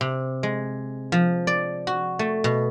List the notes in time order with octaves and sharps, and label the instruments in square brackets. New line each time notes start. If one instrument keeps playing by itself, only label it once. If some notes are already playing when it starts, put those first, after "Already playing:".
[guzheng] C3
G#3
F3
D5
F#4
A3
B2